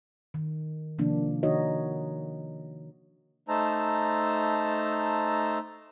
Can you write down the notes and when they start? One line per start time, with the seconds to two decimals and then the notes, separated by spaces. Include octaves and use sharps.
0.34 D#3
0.99 C3 D#3 F3 A#3 D4
1.43 D#3 D#4 F#4 C#5 D#5
3.49 A3 D#4 C5 A5 A#5 E6